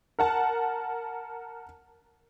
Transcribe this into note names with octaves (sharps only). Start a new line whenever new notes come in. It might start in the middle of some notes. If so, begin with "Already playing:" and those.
A#4 F#5 A5